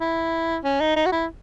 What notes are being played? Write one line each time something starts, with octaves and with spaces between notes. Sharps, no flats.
E4
C#4
D#4
D#4
F#4
E4